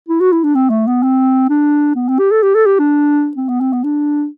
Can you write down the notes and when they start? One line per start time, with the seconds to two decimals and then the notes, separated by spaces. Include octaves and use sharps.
0.09 E4
0.20 F#4
0.32 E4
0.44 D4
0.55 C4
0.70 A3
0.87 B3
1.03 C4
1.49 D4
1.96 B3
2.08 C4
2.19 G4
2.31 A4
2.43 G4
2.55 A4
2.66 G4
2.79 D4
3.37 C4
3.49 B3
3.61 C4
3.73 B3
3.84 D4